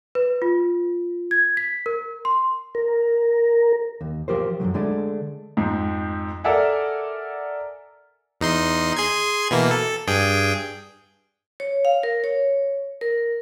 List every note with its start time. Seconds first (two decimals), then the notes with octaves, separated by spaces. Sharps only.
0.15 B4
0.42 F4
1.31 G#6
1.57 B6
1.86 A#4
2.25 C6
2.75 A#4
4.01 D#2
4.28 F3 G4 A#4 C5
4.60 F#2 D3 D#3 F#3
4.74 D3 G#3 A3 D4
5.57 F2 G#2
6.44 A4 A#4 D5 E5 F#5 G#5
8.41 E2 D#4 C6
8.97 G#4 C6 G#6
9.51 B2 E3 A#3
9.71 A4
10.07 G2 G#4 G5
11.60 C#5
11.85 F5
12.03 A#4
12.24 C#5
13.01 A#4